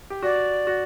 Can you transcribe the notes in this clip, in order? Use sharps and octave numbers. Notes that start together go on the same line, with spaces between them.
G4
F#4 D5
F#4